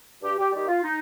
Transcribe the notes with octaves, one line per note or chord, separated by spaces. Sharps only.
G2 G4
G4
D#3 G3 G4
F4
D#4